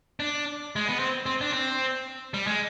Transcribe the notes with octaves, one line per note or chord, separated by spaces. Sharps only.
D4
G#3
B3
C4
C4
D4
C4
G3
G#3